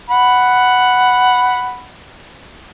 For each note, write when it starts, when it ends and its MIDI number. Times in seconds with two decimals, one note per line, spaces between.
0.10 1.86 78
0.10 1.86 83